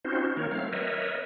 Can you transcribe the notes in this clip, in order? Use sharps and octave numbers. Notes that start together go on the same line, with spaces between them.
C4 C#4 D#4 F4 F#4 C5
D#3 A#3 A#4 C#5
F#3 A3 C4 F5
A#4 B4 C#5 D#5 E5